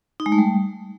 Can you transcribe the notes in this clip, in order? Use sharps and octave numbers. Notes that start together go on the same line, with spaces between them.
D#4
G#3
A3
G3